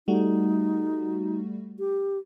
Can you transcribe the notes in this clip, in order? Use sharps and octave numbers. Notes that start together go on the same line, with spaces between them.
G3 A3 D#4 F#4
G4